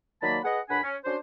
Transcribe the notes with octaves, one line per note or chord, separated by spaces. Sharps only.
D#3 F#3 A#3 D5 A5 B5
G#4 B4 D#5 F#5
C#2 F#2 D4 F#5 G#5 B5
C#4
C#4 D4 F#4 C5